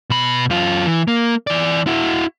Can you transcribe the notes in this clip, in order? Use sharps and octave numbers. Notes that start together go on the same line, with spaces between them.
B2 B5
F#2 F4
E3
A#3
E3 D5
E4 F#4